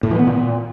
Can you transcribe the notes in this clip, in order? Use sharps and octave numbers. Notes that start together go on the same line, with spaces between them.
A2
E3
B3
A#2